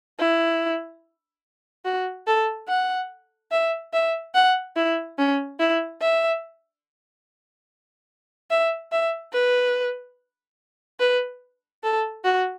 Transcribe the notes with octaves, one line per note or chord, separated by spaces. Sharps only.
E4
F#4
A4
F#5
E5
E5
F#5
E4
C#4
E4
E5
E5
E5
B4
B4
A4
F#4